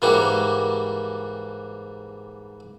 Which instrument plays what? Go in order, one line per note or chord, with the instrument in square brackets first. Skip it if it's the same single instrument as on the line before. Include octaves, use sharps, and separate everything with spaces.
[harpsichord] G#2 E3 G3 A#3 F#4 G4